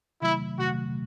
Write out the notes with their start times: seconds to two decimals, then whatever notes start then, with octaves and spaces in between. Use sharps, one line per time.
0.22 C3 D#3 F#3 A3 E4
0.59 C3 D#3 F#3 A3 F#4